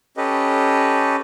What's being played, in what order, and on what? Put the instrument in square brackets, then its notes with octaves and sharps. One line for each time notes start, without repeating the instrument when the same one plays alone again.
[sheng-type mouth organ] C#4 G4 A4 B4 D#5